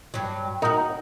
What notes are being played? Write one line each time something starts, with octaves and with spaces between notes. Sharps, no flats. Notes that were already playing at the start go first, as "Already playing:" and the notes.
G2 F#3
D#4 F#4 A#4